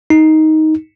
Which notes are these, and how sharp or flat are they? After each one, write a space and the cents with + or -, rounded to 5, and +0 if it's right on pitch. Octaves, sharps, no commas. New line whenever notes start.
D#4 +10